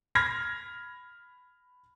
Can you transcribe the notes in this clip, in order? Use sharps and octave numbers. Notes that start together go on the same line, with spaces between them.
B5 F6 G#6 A#6